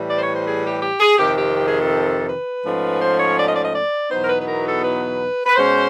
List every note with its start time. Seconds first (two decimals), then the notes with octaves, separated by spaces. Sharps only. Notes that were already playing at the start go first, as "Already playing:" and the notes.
Already playing: A2 E3 G3
0.09 D5
0.16 C5
0.21 C#5
0.34 C5
0.46 G#4
0.64 G4
0.82 G4
1.00 G#4
1.18 F2 C3 D#3 G4
1.37 G4
1.55 G4
1.68 G#4
1.80 A4
2.28 B4
2.64 G#2 F3 A3 C#4
3.01 C5
3.19 C#5
3.38 D5
3.47 D#5
3.56 D5
3.65 D#5
3.74 D5
4.10 E2 B2 F#3 B3 D#4 C5
4.23 A#4
4.28 B4
4.40 B4
4.47 A#4
4.65 A4
4.84 B4
5.46 B4
5.56 B2 G#3 C#4 C5